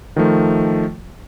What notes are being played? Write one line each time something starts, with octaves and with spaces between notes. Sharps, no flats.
D#3 F3 A3